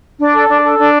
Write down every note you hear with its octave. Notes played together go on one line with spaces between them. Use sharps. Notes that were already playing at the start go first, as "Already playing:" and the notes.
D4
A4
D4
A4
D4